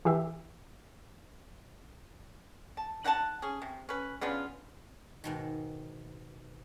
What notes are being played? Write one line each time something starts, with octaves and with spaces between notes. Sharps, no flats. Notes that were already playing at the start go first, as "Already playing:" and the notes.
E3 G4 E5
A5
D#4 F#5 G#5 A5
C#4 G#4
C3
C#4 B4
C#3 B3 D4 F4
G#2 B2 D#3